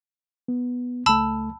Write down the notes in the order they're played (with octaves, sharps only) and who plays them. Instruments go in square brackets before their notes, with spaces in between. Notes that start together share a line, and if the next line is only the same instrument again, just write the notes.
[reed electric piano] B3
[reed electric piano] C#2 A3 [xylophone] A5 B5 E6